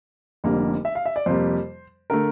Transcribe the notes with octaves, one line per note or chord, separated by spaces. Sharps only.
F1 F2 D3 G3 A#3
E5
F5
E5
D5
F2 C3 G3 A#3 C5
D3 A3 A#4